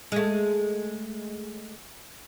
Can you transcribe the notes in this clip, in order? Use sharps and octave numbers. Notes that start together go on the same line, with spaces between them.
G#3 A3